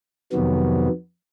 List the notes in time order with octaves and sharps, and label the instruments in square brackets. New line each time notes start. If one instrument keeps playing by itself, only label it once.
[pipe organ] F2 C3 D#3 F#3 B3